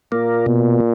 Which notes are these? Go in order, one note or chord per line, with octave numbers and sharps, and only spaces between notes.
A#2 A#3
B2